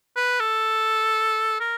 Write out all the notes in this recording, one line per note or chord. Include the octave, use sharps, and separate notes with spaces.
B4
A4
A#4